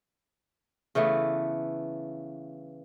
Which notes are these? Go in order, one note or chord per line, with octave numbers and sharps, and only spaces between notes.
C#3 E3 A3 B3